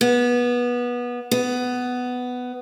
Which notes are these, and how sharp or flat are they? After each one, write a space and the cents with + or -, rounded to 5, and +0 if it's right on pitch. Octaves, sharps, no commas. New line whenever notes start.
B3 -20
B3 +10